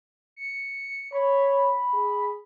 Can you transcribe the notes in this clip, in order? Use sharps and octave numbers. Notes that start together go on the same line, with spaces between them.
C#7
C#5 B5
G#4